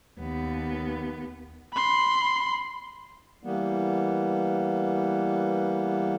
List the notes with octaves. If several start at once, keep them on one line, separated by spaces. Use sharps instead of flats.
D#2 B3
B5 C6
E3 G3 A#3 B3